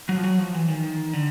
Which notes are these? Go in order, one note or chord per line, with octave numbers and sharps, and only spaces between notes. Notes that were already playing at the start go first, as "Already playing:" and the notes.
F#3
F3
F#3
F3
E3
D#3
D3